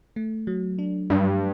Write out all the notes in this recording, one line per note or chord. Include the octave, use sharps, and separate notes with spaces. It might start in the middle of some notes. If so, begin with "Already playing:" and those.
A3
F#3
D4
G2 F#3